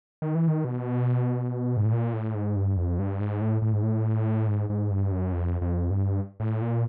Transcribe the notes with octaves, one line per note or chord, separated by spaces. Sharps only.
D#3
E3
D#3
B2
G#2
A2
A#2
A2
G#2
G2
F2
G2
G#2
A2
A2
G#2
A2
G#2
G#2
G2
F#2
F2
F2
G2
A2
A#2